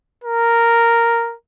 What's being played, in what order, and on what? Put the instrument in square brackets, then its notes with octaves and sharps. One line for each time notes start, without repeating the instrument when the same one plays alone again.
[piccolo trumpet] A#4